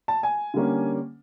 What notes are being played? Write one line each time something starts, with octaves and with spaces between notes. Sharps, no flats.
A5
G#5
D3 G3 A#3 C#4